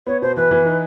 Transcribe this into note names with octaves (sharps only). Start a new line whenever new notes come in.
B3 C#5
B2 C5
E3 B4
E3
D#4